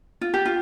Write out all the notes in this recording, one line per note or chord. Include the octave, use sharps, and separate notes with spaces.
F4
G4
F4